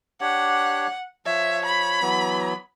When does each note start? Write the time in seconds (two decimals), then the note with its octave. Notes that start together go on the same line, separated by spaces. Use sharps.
0.21 D4 G4 C#5 F#5
1.26 F3 C#5 E5
1.66 B5
2.02 E3 F#3 B3